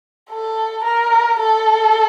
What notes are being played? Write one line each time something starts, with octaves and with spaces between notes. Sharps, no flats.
A4
A#4
A4